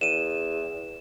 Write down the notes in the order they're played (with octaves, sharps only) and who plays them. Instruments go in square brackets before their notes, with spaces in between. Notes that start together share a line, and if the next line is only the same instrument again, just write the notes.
[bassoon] E2 [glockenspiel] D#7 E7